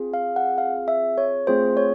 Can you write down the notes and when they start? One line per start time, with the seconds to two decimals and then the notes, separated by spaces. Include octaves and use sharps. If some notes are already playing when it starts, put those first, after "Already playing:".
Already playing: C4 F4 G#4
0.14 F5
0.36 F#5
0.58 F5
0.88 E5
1.18 C#5
1.47 A3 C4 F4 G#4 C5
1.77 C#5